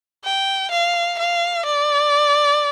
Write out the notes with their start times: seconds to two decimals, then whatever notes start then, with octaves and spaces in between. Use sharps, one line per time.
0.24 G5
0.71 F5
1.19 F5
1.66 D5